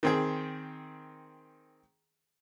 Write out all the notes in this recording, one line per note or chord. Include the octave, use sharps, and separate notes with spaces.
D#3 C4 G#4